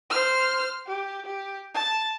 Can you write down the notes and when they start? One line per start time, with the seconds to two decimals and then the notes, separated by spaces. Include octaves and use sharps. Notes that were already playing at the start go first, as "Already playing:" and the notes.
0.10 C5 F6
0.87 G4
1.26 G4
1.74 A5